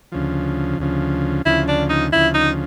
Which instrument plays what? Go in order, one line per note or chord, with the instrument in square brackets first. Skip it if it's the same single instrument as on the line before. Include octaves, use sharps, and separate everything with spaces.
[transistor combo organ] D2 C#3 F3
D2 C#3 F3
[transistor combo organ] D2 C#3 F3 [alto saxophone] E4
[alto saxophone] D4
D#4
[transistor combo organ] D2 C#3 F3 [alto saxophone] E4
[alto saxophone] D#4